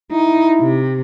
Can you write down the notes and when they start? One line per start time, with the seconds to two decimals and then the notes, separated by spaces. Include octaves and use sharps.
0.11 D#4 E4
0.60 C3